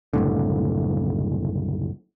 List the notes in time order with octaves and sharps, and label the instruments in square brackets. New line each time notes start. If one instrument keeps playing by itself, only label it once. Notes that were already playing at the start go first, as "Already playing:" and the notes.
[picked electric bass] F#1 C2 A2 D3